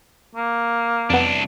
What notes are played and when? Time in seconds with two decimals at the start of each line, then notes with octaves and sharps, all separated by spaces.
0.35 A#3
1.10 C2 F2 B3 D4